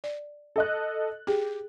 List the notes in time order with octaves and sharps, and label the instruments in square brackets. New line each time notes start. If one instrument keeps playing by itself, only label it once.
[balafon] D5
[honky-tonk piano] A4 D#5 F#6
[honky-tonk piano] G4 [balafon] G#4